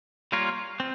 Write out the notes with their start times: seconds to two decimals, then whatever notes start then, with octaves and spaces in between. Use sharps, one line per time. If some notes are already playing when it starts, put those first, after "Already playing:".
0.32 G3 A#3 F4 A#4 C#5
0.80 C4